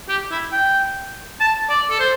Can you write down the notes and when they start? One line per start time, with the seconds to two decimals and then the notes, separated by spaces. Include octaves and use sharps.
0.09 G4
0.31 E4
0.52 G5
1.40 A5
1.69 D5
1.90 A4
1.99 C5